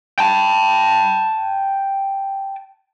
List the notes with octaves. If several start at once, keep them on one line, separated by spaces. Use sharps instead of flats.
G5 A5